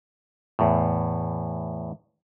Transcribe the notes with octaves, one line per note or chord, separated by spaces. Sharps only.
E2 A2